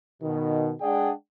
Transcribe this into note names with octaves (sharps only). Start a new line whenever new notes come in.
B2 D#3
G#3 D4 G#4 D5 F#5 G5